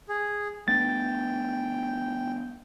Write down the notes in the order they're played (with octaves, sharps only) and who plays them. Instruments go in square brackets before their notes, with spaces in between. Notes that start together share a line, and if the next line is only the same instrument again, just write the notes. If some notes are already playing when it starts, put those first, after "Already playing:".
[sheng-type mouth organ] G#4
[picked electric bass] A3 B3 D4 [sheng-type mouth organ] G5 [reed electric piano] A6